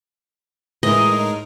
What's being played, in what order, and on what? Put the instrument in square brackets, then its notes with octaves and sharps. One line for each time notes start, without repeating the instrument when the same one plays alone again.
[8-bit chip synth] A2 G#3 A#4 [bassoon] E3 [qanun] D#5
[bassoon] D#4